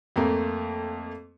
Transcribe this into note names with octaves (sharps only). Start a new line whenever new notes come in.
F2 A3 A#3